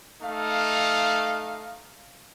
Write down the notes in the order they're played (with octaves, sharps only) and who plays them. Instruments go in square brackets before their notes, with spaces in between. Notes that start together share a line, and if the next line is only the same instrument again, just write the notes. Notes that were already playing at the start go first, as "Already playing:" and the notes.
[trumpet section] A3 D#4 F5